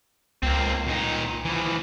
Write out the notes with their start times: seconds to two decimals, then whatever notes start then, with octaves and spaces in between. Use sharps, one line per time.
0.43 C#2 A#3 C4
0.88 A#2 D#4
1.45 E3 F3